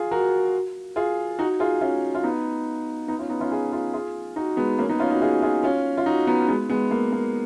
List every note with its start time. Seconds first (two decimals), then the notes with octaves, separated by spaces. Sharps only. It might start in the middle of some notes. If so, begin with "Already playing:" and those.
Already playing: F4 G#4
0.11 F#4 A#4
0.96 F4 G#4
1.39 D#4 F#4
1.60 F4 G#4
1.81 C#4 F4
2.15 F4
2.23 B3 D#4
3.08 B3 D#4
3.19 C#4 F4
3.30 B3 D#4
3.41 C#4 F4
3.52 F4 G#4
3.72 F4 G#4
3.93 F4 G#4
4.36 D#4 F#4
4.57 G#3 B3
4.79 A#3 C#4
4.89 B3 D#4
5.00 C#4 F4
5.10 D#4 F#4
5.21 F4 G#4
5.42 F4 G#4
5.63 C#4 F4
5.97 F4
6.06 D#4 F#4
6.27 B3 D#4
6.48 G#3 B3
6.69 G#3 B3
6.91 A#3
7.12 A#3